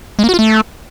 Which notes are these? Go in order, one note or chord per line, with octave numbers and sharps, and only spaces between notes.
G#3
A#3
F#4
F4
A3